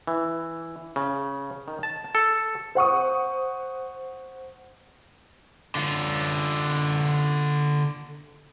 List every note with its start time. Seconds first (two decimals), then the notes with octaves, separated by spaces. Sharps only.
0.07 E3
0.96 C#3
1.68 D#3
1.83 A5
2.15 A4
2.75 C5 F#5 C#6 D#6
5.75 D3 F4